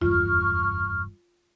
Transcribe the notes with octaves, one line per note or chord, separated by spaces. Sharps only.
F1 E2 G2 F4 C#6 F6